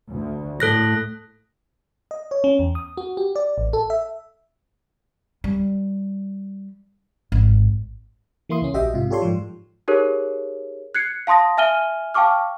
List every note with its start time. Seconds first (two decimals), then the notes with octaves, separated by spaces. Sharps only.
0.12 D2
0.60 A2 A4 F#6 A#6
2.11 D#5
2.31 C#5
2.44 C#4
2.59 E2
2.75 D#6
2.97 F#4
3.17 G4
3.36 D5
3.58 A1
3.73 A4
3.90 E5
5.44 G3
7.32 G#1
8.49 E3 A#3 E4 C6 D#6
8.62 C#2 C#4
8.73 A#1 F#4 G4 D#5 E5 G5
8.94 G#2 C3 F4
9.10 F4 G4 A4 C#5 D5 C6
9.22 G#2 F3
9.88 D#4 G4 G#4 A#4 C#5
10.94 F#6 G#6 C7 C#7
11.27 F5 A5 C6 D#6 A#6
11.58 E5 G#5 F6 D#7 G7
12.14 F5 G5 A5 C#6 D6 F6